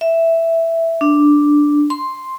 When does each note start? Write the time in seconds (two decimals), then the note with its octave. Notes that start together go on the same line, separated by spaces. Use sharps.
0.01 E5
1.01 D4
1.90 C6